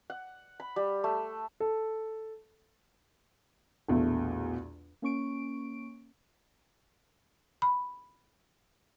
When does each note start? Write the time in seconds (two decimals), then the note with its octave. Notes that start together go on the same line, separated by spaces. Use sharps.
0.10 F#5
0.60 B5
0.76 G3
1.04 A3
1.60 A4
3.89 A#1 E2 B2 A3
5.02 A#3 C#4 C#6 D7
7.62 B5